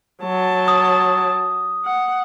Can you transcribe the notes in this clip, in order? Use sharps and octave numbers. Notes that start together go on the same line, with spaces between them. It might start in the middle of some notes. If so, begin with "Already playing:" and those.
F#3 A5
D#6
F#5